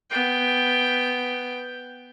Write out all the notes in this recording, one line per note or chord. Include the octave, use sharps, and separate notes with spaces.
B3 G5